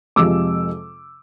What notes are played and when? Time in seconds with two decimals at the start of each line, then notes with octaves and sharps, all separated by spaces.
0.16 F2 C3 F3 G#3 D6 E6